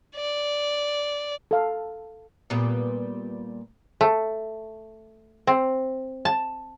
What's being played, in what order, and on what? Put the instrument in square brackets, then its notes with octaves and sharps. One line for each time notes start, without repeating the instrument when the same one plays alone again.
[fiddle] D5
[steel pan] A4 F5
[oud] A#2 G3 B3
[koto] A3
C4
A5